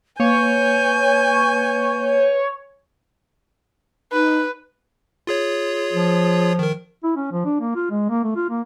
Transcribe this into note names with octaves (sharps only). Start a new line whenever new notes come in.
A#3 B4 C#5 G#5 G6
D#4 B4
F4 G#4 C#5
F3
D#3 A#4
E4
C#4
F3
D4
A#3
F4
G#3
A#3
A3
F4
A#3